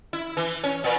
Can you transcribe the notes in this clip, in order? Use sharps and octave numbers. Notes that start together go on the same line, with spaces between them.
E4
E3
C#4
A#2 B3